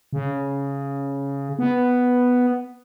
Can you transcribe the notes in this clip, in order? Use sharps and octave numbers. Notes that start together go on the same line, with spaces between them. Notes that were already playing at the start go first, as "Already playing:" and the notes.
C#3
B3